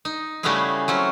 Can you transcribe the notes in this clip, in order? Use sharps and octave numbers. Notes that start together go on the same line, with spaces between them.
D#4
C#3 G3 A3 B3 E4 G#4
F#3 C4 C#4